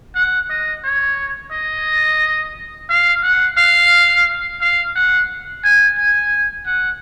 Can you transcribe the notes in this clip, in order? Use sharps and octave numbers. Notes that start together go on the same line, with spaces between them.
F#5
D#5
C#5
D#5
F5
F#5
F5
F5
F#5
G#5
G#5
F#5